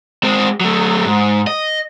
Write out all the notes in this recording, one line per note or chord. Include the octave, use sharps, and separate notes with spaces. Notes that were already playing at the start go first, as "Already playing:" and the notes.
G#3 C4
F#3 A3
G#2
D#5